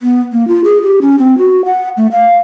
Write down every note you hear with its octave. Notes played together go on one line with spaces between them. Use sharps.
B3
A#3
F4
G#4
G4
C#4
C4
F#4
F#5
A3
F5